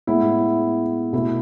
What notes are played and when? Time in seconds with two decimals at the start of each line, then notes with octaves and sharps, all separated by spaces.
0.07 A2 G#3 B3 E4
1.13 B2 A3 E4